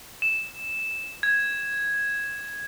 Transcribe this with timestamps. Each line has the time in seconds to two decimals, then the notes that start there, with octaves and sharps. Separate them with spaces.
0.22 E7
1.23 G#6